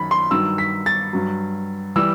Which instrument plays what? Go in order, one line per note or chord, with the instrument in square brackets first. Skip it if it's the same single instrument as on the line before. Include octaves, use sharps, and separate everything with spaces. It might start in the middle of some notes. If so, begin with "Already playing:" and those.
Already playing: [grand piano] F#2 D#3 B5
C6
G2 D#3 F#3 E6
B6
A6
G2 F#3
E3 G3 E6